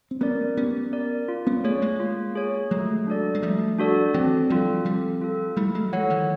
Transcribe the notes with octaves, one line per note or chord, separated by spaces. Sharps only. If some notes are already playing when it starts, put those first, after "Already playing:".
C4
B3 C#4 A#4 D5
B3 C#4 G4
A#4 D5
F4
B3 C#4
A3 B3 G#4 C#5
G#3 A#3
F4
G#4 C#5
F#3 G#3 A3
D4 F#4 A4 D5
G#3
F3 G3 A3
D4 F#4 A4 D5
E3 F#3 C4
F3 G3 F4 A4
F3 G3 C4
F4 A4
G3 A3 E4
F#3 G#3
E3 F#3 A4 C#5 F#5
D#3 F3